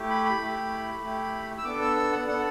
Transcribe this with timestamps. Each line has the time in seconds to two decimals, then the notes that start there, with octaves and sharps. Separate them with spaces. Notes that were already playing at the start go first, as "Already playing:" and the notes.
Already playing: A3 E4 G4
0.10 B5
0.25 B5
0.40 A3 E4 G4
1.03 A3 E4 G4
1.58 E6
1.65 B3 D4 A4 D6
1.81 E6
1.96 E6
2.12 F#5
2.28 B3 D4 A4 F#5